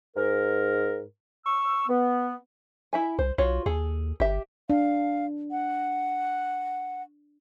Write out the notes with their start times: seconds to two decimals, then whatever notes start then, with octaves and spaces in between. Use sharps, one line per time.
0.17 G#2 A#4
1.46 C#6 E6
1.88 B3
2.93 E4 E5 G#5
3.19 C2 C5
3.38 B1 F4 F#4 C#5
3.66 D#2 G#4 A4
4.20 G1 G4 E5
4.70 D4 F5
5.51 F#5